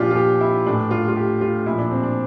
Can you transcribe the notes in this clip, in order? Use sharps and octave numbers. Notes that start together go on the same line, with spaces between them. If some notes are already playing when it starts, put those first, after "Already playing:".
Already playing: A#2 F3 D4 F4 G4
F4
G4
E4
A2 E3 D4
F4
F4
G4
F4
A#2 F3 E4
D4
C4
D4